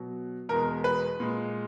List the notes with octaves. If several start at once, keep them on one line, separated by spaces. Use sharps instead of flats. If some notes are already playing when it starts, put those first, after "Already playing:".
Already playing: B2 F#3
E2 B2 G#3 A#4
B4
A#2 G#3